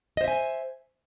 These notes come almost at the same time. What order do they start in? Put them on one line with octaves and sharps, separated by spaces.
D#5 C5 E5 G#5